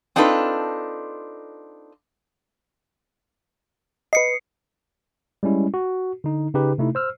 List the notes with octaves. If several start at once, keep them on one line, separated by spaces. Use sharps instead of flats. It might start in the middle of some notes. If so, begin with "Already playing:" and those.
C4 D4 D#4 F4 A4 B4
B4 D#5 C7 C#7
G3 G#3 C#4 E4
F#4
D3 D#4
C#3 D#4 G4 B4
C3 A3 D#4 E4
C5 E6 F6